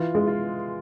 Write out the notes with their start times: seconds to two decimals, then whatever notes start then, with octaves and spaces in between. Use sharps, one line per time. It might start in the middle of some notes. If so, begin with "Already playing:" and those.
Already playing: E3 F4
0.15 G#3
0.27 F4